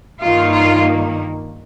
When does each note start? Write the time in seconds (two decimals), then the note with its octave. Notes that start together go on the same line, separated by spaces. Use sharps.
0.20 G2 D#3 A#3 D#4 F4
0.51 F4